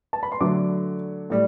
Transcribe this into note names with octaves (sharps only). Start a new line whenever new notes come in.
A5
B5
C6
D3 F#3 A3 D4 D6
A2 G3